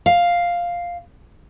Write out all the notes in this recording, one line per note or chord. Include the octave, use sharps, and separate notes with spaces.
F5